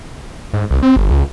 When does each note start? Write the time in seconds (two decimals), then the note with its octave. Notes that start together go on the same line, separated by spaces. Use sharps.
0.53 G#2
0.71 C2
0.83 C4
0.96 G1
1.10 C#2